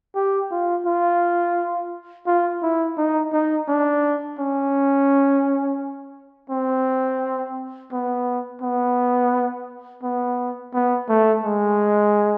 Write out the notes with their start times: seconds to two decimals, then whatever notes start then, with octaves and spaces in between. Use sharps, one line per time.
0.15 G4
0.51 F4
0.86 F4
2.27 F4
2.62 E4
2.98 D#4
3.33 D#4
3.68 D4
4.39 C#4
6.50 C4
7.92 B3
8.62 B3
10.03 B3
10.74 B3
11.09 A3
11.44 G#3